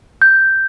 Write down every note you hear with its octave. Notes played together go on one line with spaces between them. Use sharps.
G6